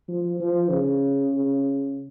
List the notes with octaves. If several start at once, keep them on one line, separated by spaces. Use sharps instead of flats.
F3
F3
C#3
C#3